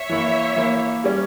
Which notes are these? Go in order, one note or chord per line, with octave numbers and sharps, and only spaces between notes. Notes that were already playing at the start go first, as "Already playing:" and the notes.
Already playing: C#5 E5
E3 A#3 E4
E3 A#3 E4
G3 C#4